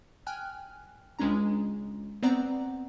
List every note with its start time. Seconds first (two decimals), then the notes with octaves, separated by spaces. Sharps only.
0.27 G5 G#5 F6 F#6
1.19 C#2 G#3 C#4 D4 A#5
2.22 B3 C4 D5 F#5 A#5